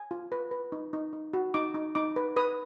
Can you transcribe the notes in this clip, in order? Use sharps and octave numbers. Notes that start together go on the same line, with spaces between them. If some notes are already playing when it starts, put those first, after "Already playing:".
Already playing: G#5
F4
B4
B4
D#4
D#4
D#4
F#4
D#4 D6
D#4
D#4 D6
B4
B4 D#6